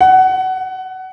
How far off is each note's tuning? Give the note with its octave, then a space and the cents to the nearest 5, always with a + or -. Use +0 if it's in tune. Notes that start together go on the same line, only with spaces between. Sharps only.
F#5 +20